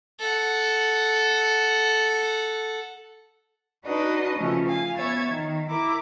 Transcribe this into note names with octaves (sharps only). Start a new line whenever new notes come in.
A4 F#5
D4 D#4 F#4 B4 D#5
C#3 F3 A3 C#4
F5 G#5
B3 C#5 E5 G#6 A6
D#3
E4 A#4 D6